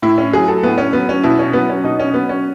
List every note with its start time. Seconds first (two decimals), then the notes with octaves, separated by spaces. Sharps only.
0.02 A2 E4
0.18 C#4
0.33 F#3 G#4
0.48 A4
0.63 A2 B3
0.78 C#4
0.93 F#3 B3
1.09 C#4
1.24 B2 E4
1.39 C#4
1.53 F#3 B3
1.69 C#4
1.84 B2 D#4
2.00 C#4
2.14 F#3 B3
2.29 C#4